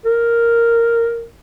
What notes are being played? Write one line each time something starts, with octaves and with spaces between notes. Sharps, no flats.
A#4